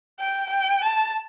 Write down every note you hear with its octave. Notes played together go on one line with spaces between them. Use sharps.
G5
G5
A5